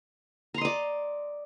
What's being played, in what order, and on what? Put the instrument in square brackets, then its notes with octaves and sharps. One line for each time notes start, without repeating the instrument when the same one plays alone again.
[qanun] A#5
C6
D#5
D5